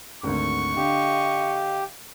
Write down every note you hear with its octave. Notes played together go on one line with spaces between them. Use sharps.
G#1 D2 C#6
D3 G4 D#5 F5